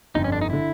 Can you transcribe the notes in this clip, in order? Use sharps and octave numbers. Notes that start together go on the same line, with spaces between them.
G1 F2 D3 D#4
C#4
D4
D#4
D3 E4